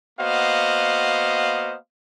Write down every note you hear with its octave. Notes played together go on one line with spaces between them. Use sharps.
A#3 B3 F#4 C5 D#5 F5